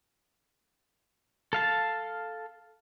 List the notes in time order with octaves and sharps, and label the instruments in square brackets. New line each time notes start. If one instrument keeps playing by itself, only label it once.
[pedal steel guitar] A4 F5 A5